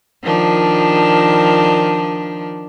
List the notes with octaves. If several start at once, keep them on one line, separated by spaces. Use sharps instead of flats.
D#3 F3 D4